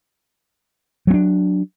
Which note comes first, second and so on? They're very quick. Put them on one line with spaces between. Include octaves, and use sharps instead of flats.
F#3 C4 D4